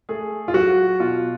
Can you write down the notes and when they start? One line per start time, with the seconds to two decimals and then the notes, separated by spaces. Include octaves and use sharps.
0.09 A3 G#4
0.48 F4
0.54 F#3 F#4
0.99 B2 F4